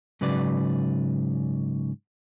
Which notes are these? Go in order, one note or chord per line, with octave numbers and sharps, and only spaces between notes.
G#2 C#3 F#3 B4 D5